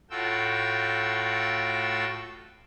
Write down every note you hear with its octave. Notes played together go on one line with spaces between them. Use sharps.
A2 F4 F#4 A4 G5 E6